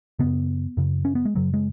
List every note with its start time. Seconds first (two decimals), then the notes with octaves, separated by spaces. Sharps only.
0.19 F#2 C#3 B3
0.77 F#2 C#3
1.05 C#4
1.15 B3
1.25 G#3
1.35 F#2 C#3 F#3
1.54 G#3